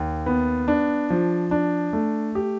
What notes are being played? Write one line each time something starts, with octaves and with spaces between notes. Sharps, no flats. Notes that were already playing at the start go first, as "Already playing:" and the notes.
Already playing: D#2
B3
D4
F3
D4
A3
G4